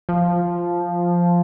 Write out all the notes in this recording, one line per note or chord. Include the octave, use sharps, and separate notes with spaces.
F3